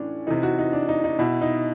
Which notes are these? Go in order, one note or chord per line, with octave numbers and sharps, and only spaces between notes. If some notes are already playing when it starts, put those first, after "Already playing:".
Already playing: A2 E3 C#4 D4
C3 E3 D#4
F#4
D#4
D4
D#4
D#4
B2 E4
D#4